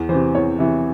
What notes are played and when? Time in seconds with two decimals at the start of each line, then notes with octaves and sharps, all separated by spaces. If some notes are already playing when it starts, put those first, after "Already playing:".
Already playing: E2
0.09 E3 C5
0.14 C3
0.35 E2 C#5
0.59 C3 E3 E5